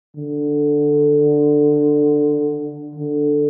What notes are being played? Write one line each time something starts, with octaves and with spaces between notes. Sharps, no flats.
D3
D3